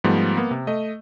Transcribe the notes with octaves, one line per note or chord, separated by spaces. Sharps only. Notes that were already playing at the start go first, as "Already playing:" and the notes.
G#2 F3 G3 A3 B3
A#3 B3
C3
A3 D#5